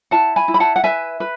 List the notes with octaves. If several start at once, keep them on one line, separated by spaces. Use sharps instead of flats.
E4 F#5 A5
G#5 B5
E4
B5
F#5 A5
F#5
B4 E5 G#5
B4